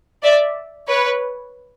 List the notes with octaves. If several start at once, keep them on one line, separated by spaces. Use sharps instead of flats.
D5 E5
B4 C#5